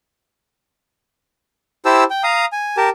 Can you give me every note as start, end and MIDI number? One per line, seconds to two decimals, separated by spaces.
1.85 2.04 64
1.85 2.04 67
1.85 2.04 72
1.85 2.04 81
1.85 2.04 88
2.10 2.23 79
2.23 2.45 77
2.23 2.45 82
2.23 2.45 87
2.52 2.77 80
2.77 2.90 67
2.77 2.90 70
2.77 2.90 81